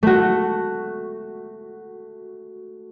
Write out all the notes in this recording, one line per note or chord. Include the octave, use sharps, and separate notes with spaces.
A3 F#4